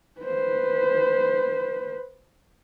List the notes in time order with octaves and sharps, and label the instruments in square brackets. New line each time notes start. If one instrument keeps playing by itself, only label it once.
[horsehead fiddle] B4 C5